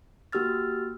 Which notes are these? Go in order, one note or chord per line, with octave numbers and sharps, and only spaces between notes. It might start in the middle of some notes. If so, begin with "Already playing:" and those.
A#3 F#4 G4 E6 F6 A6